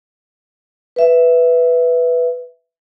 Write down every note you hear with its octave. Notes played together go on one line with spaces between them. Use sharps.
B4 E5